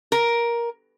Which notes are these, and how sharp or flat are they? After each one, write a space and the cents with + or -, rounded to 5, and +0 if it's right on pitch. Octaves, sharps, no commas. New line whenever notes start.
A#4 +10